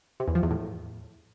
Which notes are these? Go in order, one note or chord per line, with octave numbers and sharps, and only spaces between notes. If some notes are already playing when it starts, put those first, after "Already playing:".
C3
E2
F3
E2
A2